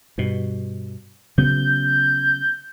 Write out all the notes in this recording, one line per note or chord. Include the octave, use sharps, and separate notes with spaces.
G2 B2
C#3 F#3 B3 G6